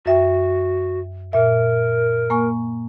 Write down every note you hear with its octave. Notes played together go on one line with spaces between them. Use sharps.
F#2 F#4 E5 G5
A#2 A#4 E5
A#3 G#5 C#6